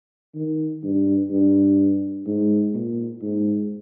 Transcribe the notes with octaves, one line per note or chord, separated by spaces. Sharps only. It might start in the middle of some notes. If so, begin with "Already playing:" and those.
D#3
G2
G2
G#2
A#2
G#2